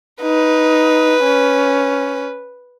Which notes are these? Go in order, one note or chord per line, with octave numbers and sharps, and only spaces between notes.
D#4 B4
C#4